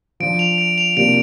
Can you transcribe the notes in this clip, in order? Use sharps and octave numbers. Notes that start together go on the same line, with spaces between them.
F3 D4 F4 D7
F7
D7
F7
C3 A#3 D4 F4 D7